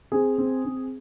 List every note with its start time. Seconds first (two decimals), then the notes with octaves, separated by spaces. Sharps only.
0.12 C4 G#4
0.38 C4
0.65 C4